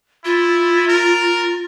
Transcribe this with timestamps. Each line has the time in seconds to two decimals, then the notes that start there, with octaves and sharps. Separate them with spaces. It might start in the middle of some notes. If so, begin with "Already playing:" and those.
0.25 E4 F4
0.88 A#4